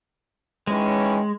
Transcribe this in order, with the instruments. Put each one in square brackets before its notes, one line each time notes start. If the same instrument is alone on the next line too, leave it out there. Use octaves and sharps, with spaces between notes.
[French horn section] D#3 E3 C#4 [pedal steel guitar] G#3